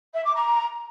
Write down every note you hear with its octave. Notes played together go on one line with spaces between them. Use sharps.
E5
D6
A#5